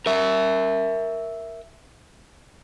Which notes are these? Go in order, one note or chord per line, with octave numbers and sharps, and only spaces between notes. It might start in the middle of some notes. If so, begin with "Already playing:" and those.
A#4 E5